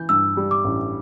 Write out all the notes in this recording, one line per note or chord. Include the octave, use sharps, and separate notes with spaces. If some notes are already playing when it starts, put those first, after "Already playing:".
Already playing: E3 G6
G2 E6
G3
D6
A1